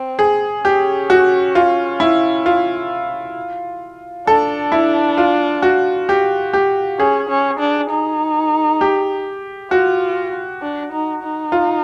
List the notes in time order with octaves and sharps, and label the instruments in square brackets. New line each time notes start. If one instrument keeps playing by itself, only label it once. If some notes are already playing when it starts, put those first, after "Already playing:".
Already playing: [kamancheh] C4
[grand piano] G#4
[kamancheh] C#4 [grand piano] G4
[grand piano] F#4
F4
E4
F4
[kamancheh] D4 [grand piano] A4
[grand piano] E4
F4
F#4
G4
G4
[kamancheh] C#4 [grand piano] G#4
[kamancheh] C#4
D4
D#4
[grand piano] G4
[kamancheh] F4 [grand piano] F#4
[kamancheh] D4
D#4
D#4
[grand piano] F4